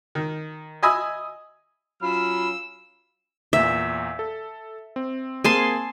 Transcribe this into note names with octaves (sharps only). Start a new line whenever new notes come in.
D#3
D#5 E5 G#5 B5 D#6 E6
F#3 C#4 F4 B5 E6
E2 A#2 E5
A4
C4
A#3 C4 G#4 G#5 A5 C6